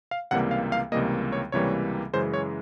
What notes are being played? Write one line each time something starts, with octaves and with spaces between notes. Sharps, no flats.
F5
C#2 C3 E3 G3 A#3 F#5
F5
F5
C#2 C3 E3 G3 A#3 D#5
C#5
C#2 C3 E3 G3 A#3 C#5
F#2 C#3 E3 G#3 C5
C#5